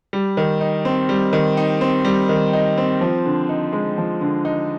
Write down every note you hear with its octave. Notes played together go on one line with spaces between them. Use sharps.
G3
D#3
D#4
C4
G3
D#3
D#4
C4
G3
D#3
D#4
C4
F3
D3
D#4
G#3
F3
D3
D#4